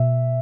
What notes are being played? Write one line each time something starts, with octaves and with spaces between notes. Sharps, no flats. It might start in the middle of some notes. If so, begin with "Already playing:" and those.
Already playing: B2 E5